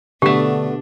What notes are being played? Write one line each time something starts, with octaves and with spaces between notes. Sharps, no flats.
B2 D3 A3 B3 D4 G4